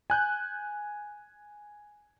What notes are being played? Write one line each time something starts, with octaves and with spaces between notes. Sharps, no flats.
G#5 F#6 G6